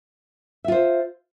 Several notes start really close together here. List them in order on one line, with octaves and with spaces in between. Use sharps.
E5 F4 C5